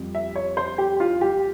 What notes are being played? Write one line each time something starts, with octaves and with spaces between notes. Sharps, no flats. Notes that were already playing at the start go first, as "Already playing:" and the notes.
Already playing: F2 G3 C4
E5
C#5
C5
G4
F4
G4